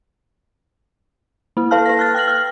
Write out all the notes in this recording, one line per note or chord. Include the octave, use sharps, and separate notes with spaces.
A#3 E4
A4 B4 F5 A5 F6
B4 A#6
F6 F#6 A6
G5 F6 A#6 F#7
F6